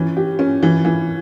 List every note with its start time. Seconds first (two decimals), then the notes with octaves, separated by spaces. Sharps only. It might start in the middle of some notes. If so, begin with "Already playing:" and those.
Already playing: E3 C#4
0.17 G4
0.39 C#4
0.63 E3
0.85 E3